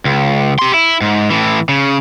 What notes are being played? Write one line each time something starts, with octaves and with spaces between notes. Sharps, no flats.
C#2
G4 C6
E4
G#2
A2 E3
C#3